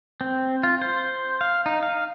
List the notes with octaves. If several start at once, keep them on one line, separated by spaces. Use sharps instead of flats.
C4
F4
C5
F5
D#4
F5